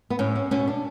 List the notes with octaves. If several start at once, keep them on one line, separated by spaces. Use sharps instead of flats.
B3
A2 C#4
C#4
B2 C#4
D4